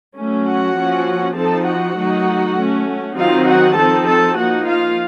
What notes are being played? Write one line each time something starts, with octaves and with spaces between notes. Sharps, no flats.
F#3 A3 C#4
F#4 F#5
F3 A#3 C#4
F3 C4 D#4 A4 A5
F#4 F#5
D#3 F#3 A3 D#4
A3 C#4
D#3 F#3 C4 D#4 F4 F5
F#4 F#5
F3 C4 D#4 A4 A5
A4 A5
F3 A#3 D#4 F#4 F#5
F4 F5